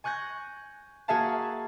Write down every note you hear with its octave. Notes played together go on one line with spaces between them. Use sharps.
G#5 C#6 F#6 G6 A#6
A#3 F#4 G#4 E5 F5 A5